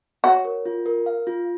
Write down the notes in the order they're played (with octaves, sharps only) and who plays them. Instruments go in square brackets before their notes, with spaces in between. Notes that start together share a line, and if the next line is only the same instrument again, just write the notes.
[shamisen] F#4 [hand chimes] C#5
[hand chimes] A#4
F4
A#4
F5
F4